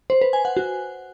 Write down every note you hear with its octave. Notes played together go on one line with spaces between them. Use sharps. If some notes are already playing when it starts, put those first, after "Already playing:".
C5
B4
G#5
F#5
F#4